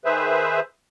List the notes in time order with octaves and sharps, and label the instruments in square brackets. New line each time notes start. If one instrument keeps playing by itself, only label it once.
[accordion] D#3 G#4 B4 C5 E5